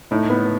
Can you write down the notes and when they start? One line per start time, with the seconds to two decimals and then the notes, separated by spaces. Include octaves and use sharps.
0.11 A2 D#4
0.30 B3